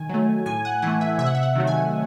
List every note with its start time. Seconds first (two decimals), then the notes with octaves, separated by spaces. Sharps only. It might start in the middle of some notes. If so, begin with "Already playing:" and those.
Already playing: D#3 G#5
0.09 F#3 A3
0.46 A2 G#5
0.65 F#5
0.82 E3 A3 F#5
1.01 E5
1.18 C3 E5
1.26 F#5
1.35 E5
1.43 F#5
1.56 D#3 F#3 A3
1.67 G#5